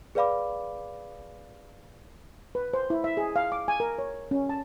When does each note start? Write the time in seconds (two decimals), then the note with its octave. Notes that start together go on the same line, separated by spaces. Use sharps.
0.15 G#4 B4 D5 F5 B5 D6
2.55 B4
2.74 C5
2.90 E4
3.04 E5
3.17 G#4
3.36 F5
3.52 D6
3.68 G#5
3.80 A#4
3.98 C#5
4.31 C#4
4.49 A5